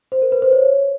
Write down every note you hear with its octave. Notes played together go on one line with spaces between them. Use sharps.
C5
A#4
B4
C5
C#5